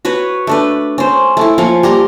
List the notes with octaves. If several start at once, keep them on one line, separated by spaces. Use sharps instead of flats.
F#4 B4 C#5
A3 D4 B4
C#4 C5
A3 E4
F3 A#3 C#4 C#6
G3 A#3 A#5 C6